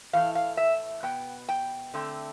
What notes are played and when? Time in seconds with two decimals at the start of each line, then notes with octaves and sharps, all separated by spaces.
0.13 A2 E3 A3 F5
0.35 F5
0.57 E5
1.03 B2 B3 G5
1.49 G5
1.94 D3 A3 C4